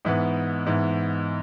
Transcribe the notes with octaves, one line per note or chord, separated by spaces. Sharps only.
G#2 E3 B3
G#2 E3 B3